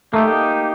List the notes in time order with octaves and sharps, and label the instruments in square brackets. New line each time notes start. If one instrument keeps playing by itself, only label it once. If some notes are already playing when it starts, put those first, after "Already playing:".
[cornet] A3 [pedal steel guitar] A#3 D#4 G4